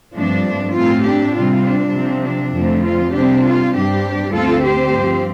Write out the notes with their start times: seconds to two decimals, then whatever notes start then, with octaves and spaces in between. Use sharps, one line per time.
0.15 G2 F3 A3 C4 D4
0.75 A2 A3 C4 F4
1.04 D4 G4
1.35 C3 G3 C4 F4
1.65 D4
1.94 C3 F3 C4
2.24 D4
2.54 F2 D3 F3 A3 C4
2.84 F4
3.13 C3 G3 C4 D4 G4
3.44 F4
3.73 G2 G3 C4 D4 G4
4.33 D2 D3 A3 C4 F4 A4
4.63 G4 C5
4.93 G2 F3 C4